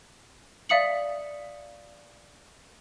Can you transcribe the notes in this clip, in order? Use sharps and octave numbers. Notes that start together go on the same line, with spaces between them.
D5 E5 F5 D#6 C#7 F#7